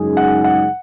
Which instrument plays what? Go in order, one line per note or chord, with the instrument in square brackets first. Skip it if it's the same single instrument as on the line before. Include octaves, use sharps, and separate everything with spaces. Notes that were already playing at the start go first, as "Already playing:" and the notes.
Already playing: [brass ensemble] F#2 C#3 G#3 D#4 G#4
[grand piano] F#5
F#5